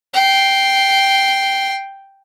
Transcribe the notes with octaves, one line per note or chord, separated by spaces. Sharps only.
G5 C7